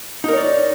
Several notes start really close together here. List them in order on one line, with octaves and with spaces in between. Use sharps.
D#4 A#4 C#5 D5